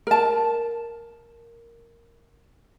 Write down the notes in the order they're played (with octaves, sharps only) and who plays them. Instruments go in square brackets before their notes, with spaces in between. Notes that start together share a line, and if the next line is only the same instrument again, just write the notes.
[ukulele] A#4 A5